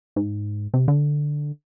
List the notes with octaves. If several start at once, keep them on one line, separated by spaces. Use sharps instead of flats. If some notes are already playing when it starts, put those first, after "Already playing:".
G#2
C3
D3